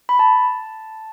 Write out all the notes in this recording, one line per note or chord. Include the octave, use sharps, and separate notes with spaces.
B5
A5